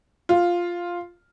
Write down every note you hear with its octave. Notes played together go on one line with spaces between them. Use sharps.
F4